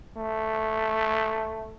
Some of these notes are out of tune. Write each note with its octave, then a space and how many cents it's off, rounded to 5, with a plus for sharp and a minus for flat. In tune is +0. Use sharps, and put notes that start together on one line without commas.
A3 +0